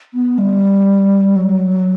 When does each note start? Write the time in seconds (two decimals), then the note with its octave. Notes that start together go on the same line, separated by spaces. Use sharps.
0.14 B3
0.38 G3
1.35 F#3